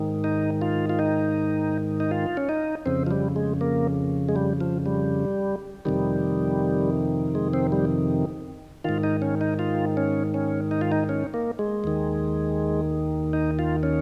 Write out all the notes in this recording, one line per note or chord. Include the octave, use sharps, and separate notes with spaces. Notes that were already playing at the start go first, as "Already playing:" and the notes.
Already playing: G#2 D#3
D#4
F4
F4
D#4
D#4
F4
C#4
D#4
F2 C#3 C4
F3
G3
G#3
A#3
G#3
G3
F3
G3
F2 C3 D#3 G3
G#3
C4
G3
G#2 D#3 F4
D#4
C#4
D#4
F4
C#4
C#4
D#4
F4
D#4
C#4
A#3
G#3
D#2 D#3
D#4
F4
C#4